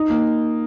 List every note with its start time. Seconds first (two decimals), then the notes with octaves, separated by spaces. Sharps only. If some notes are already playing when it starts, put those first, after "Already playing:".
Already playing: D#4
0.10 A#3